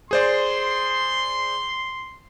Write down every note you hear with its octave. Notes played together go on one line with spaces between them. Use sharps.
G#4 C5 D5 C6